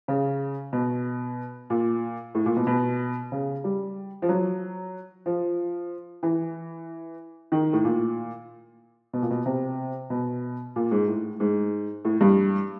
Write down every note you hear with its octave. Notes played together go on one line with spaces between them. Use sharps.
C#3
B2
A#2
A2
A#2
B2
B2
C#3
G3
F3
F#3
F3
E3
D#3
A2
A#2
B2
A#2
B2
C3
B2
A#2
G#2
A2
G#2
A2
G2